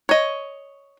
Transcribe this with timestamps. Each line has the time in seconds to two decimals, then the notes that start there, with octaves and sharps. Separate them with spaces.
0.09 C#5 D#5